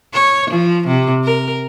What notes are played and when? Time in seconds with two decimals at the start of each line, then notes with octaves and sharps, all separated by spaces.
0.14 C#5
0.51 F3
0.87 C3
1.24 A#4